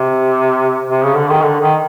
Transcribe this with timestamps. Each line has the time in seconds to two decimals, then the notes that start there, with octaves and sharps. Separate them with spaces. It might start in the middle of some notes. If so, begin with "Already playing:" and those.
Already playing: C3
0.89 C3
1.03 C#3
1.16 D3
1.30 D#3
1.43 D3
1.61 D#3